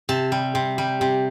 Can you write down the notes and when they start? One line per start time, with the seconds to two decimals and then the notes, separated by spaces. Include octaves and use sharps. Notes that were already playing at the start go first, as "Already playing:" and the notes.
0.09 C3 A5
0.32 G3
0.55 C3
0.78 G3
1.01 C3